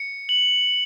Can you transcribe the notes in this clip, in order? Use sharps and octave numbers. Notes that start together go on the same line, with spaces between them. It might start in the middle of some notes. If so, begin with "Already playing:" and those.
Already playing: C#7
F#7